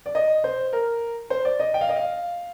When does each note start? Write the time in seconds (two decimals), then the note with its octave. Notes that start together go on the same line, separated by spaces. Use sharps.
0.06 D5
0.15 D#5
0.44 C5
0.73 A#4
1.30 C5
1.45 D5
1.60 D#5
1.74 G5
1.81 F5
1.89 D#5
1.96 F5